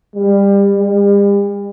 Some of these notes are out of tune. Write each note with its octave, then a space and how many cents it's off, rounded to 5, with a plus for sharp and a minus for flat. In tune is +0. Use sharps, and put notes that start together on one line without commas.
G3 +25
G3 +45